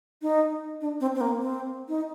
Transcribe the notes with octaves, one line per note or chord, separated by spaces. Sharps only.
D#4
D4
C4
C4
A#3
C4
D#4